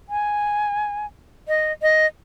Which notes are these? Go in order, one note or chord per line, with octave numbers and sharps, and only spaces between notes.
G#5
D#5
D#5